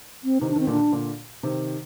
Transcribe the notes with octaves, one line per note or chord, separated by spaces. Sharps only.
C4
C3 D#3 D#4
D4
D#3 C4
A#2 D3 D4
A#2 D3
C3 D#3